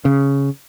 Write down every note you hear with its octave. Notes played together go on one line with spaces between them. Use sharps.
C#3